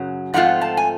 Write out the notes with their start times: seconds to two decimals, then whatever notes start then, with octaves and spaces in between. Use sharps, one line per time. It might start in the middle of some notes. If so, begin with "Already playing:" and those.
Already playing: F#2 C#3 F#3
0.34 G#2 F3 A3 C4 F4 F#5
0.61 A5
0.77 G#5